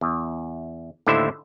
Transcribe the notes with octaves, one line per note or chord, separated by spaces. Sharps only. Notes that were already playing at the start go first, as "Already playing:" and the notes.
E2
D#2 A2 D3 E4 C5 E5